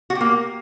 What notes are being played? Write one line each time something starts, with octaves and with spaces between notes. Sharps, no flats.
F#4
G4
A#3